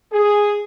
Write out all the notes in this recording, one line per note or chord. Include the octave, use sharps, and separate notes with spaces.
G#4